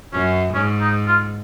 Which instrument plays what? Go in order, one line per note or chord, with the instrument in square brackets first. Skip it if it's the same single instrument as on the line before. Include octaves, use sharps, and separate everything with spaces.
[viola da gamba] F#2 [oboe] C#4
[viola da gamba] G#2 [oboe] C#4
[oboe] D#4
F4